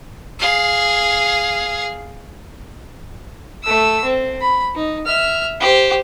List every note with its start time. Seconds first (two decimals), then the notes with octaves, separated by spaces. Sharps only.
0.39 G#4 F5
3.63 A3 E6
4.05 C4
4.41 B5
4.75 D#4
5.06 E5 F6
5.60 G4 C5